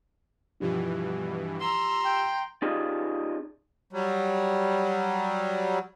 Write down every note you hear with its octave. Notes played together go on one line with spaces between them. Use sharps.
G2 B2 E3 F3 G4
A#5 C6 E6
G5
C#4 D#4 F4 G4 G#4 D5
F#3 G3